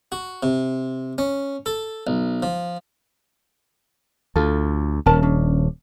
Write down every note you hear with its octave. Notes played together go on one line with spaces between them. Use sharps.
F#4
C3
C#4
A4
B1
F3
D2 F4 A4
D#1 C#4 A#4 A5
C#4 D4